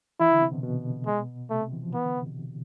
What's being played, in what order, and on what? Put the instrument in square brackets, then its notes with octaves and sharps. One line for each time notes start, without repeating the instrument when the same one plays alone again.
[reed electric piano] E3 [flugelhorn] E4
[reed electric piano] D3
C3
B2
B2
[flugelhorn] G#3
[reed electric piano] C3 [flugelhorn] A3
[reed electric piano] C3
E3
F3
[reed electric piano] E3 [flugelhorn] B3
[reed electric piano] D3
C3
B2